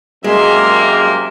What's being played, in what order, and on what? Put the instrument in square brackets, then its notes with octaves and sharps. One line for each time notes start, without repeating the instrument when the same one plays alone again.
[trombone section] F#2 C3 A#3 [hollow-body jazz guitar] G#3 [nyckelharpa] E5 C6